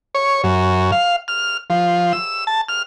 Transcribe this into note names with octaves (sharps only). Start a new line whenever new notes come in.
C#5
F#2
F5
F6
F3
E6
A5
F6